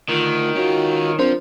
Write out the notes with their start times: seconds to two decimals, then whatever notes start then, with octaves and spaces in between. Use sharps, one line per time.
0.09 D2 D#3 F4
0.56 C#4 F4 F#4
1.19 F3 C4 D4 A#4 C5